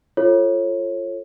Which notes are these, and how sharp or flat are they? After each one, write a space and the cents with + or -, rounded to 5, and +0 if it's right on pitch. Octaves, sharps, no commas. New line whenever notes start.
F4 -10 A4 +0 C#5 -30